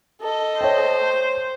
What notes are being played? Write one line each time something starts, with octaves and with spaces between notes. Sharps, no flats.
A4 D#5
C5 C#5 G5